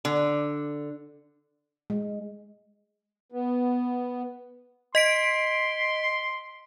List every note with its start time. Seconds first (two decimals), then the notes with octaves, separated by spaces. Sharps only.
0.05 D3
1.90 G#3
3.32 B3
4.95 D#5 C6 B6 D7